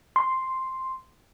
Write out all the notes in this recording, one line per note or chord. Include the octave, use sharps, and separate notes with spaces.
C6